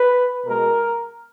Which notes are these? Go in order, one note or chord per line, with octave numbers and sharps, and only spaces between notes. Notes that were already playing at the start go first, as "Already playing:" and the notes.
Already playing: B4
B2 G#3 A#4